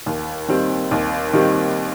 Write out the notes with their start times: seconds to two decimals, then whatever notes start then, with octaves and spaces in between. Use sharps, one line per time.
0.06 D#2
0.48 D#3 G3 C4
0.91 D#2
1.33 D#3 G3 C4